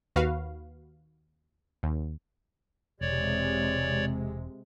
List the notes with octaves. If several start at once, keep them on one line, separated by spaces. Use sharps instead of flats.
D#2 F#4 B4 F5
D#2
E1 C3 G#3 C#5 D5